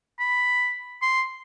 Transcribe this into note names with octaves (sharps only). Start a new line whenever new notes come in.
B5
C6